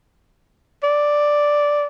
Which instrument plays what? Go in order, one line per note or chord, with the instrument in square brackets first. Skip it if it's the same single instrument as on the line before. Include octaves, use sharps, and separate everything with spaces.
[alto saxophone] D5